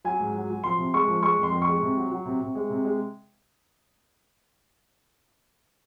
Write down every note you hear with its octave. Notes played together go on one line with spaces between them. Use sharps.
F#3 G#5
G#2
F#3
F#3
F3 C6
C3
G#3 C#6
F3
G#3 C#6
F2
C6
F2
C#6
G#3
C3
F#3
F#3
C3
C3
G#3
C3
G#3